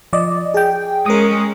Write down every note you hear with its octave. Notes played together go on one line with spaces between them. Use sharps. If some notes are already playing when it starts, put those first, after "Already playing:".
F3 D5 D#5
G#4 G5
G#3 C#4 A#4 D#6